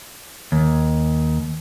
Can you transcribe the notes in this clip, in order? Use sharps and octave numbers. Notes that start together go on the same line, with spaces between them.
D#2